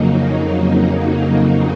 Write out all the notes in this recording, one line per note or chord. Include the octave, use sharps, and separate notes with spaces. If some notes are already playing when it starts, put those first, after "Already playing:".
Already playing: F2 C#3 F#3 A#3 D#4